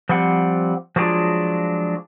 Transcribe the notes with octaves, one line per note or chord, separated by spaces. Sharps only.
F3 G3 C4 F#5
F3 F#3 G#3 D4 F4 G#4